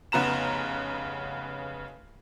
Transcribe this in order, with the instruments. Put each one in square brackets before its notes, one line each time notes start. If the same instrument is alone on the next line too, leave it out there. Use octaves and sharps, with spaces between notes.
[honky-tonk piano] F1 C#3 B3 A#5 E7